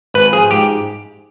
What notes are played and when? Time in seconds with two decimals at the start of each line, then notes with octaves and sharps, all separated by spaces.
0.14 G#1 B4
0.32 F3 G#4
0.51 G#2 G4